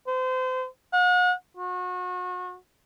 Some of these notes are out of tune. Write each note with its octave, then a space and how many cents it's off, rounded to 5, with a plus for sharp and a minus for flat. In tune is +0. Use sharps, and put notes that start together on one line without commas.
C5 -30
F#5 -40
F#4 -35